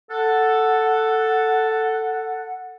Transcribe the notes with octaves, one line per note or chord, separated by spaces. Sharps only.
A4 F#5